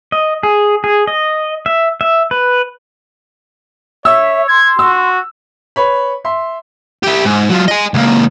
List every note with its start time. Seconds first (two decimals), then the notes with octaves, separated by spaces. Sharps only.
0.12 D#5
0.43 G#4
0.84 G#4
1.07 D#5
1.66 E5
2.01 E5
2.31 B4
4.05 C#5 E5 E6
4.49 C6 G#6
4.79 F#4 E6
5.76 B4 C#5 B5
6.25 E5 C6
7.03 E4 G4
7.25 G#2
7.49 F#3 F4
7.68 D#5 G#5
7.94 C#2 A#3